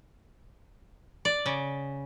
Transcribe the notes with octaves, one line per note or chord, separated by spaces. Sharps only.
D5
C#3